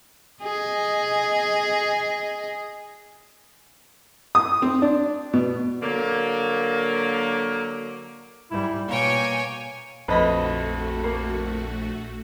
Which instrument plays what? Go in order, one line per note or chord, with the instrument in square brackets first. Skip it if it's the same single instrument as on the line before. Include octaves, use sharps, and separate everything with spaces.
[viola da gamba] G#4 D#5
[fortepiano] D#6
C4
D4
B2
[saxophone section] D3 F#3 A#3
[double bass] G#2 G3 [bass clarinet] E4
[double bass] B2 [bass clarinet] A#3 [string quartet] C#5 G5 G#5
[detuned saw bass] A#1 [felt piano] F2 [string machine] A3 F#4 [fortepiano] B4 D#5 B5
[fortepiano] A#3